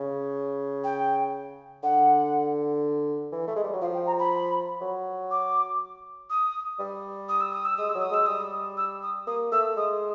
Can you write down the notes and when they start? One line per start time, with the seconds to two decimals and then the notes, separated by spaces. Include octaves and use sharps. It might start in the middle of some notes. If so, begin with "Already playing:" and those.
Already playing: C#3
0.84 G5
1.83 D3 F#5
3.32 E3
3.47 A3
3.56 G#3
3.64 G3
3.73 F#3
3.81 F3 F5
3.94 G5
4.07 A#5
4.19 B5
4.81 F#3
5.31 D6
6.30 D#6
6.79 G3
7.29 D#6
7.40 E6
7.53 D#6
7.65 E6
7.77 G#3 D#6
7.89 E6
7.95 F#3
8.02 D#6
8.11 G#3 E6
8.26 G3 D#6
8.77 E6
9.02 D#6
9.27 A#3 D#6
9.52 A3 E6
9.76 G#3 D#6